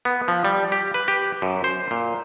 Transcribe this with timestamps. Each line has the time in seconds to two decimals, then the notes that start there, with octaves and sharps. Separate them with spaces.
0.05 B3
0.28 F3
0.45 G3
0.72 G4
0.94 B4
1.08 G4
1.42 F#2
1.64 C5
1.91 A#2